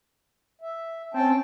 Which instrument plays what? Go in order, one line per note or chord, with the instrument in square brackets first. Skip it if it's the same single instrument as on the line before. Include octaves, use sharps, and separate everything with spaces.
[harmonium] E5
[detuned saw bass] C4 [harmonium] C#4 G5 A5